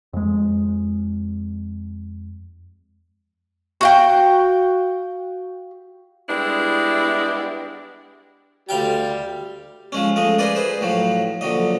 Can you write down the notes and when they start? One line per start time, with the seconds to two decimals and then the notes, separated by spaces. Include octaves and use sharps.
0.13 F2 G#3
3.81 F#4 F5 G5
6.29 G3 G#3 B3 D4 E4
8.69 D2 G3 F5 G5
9.92 F3 G#3 C#4
10.16 F3 G#3 A3 D#5
10.39 G#4 A#4 B4 D5 D#5
10.55 G#4 B4 C5
10.81 A2 F3 F#3
11.41 A#1 D3 F#3 D#5